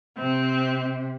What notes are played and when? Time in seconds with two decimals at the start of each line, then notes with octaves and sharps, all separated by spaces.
0.19 C3 C4